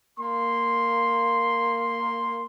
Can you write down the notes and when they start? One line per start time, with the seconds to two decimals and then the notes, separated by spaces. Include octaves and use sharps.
0.19 A#3 C6